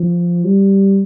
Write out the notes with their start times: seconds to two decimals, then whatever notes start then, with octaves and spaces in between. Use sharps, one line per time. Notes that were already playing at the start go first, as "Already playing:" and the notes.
Already playing: F3
0.45 G3